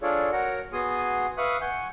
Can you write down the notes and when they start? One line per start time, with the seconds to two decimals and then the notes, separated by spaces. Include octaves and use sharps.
0.02 D4 F4 G#4 A4 C#5 D5
0.32 F#4 A#4 C#5 F#5 A#5
0.73 B3 F#4 G#4 G#5 C6 D#6
1.38 B4 E5 F5 C#6 D#6 F#6
1.61 F#5 G#5 C#6 G6